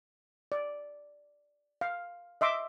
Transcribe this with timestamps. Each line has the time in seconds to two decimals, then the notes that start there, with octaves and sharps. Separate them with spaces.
0.52 D5
1.81 F5
2.41 D#5 E5 C6 D6